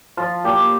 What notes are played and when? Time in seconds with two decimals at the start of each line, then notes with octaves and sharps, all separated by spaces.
0.17 F3 F4
0.44 A#2 G4